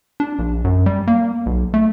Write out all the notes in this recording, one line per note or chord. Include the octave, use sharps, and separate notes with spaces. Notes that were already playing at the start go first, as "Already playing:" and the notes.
D4
A#1
F#2
G3
A#3
B1
A3